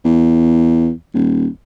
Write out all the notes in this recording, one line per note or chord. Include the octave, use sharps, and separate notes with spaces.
E2
D#1